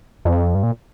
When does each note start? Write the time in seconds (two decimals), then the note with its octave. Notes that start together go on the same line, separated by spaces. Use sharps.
0.25 F2
0.55 G2
0.63 A#2